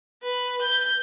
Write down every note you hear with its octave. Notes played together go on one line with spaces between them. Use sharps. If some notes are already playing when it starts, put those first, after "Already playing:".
B4
G6